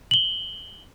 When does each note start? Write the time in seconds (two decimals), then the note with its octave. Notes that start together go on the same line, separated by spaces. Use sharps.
0.11 F#7 G7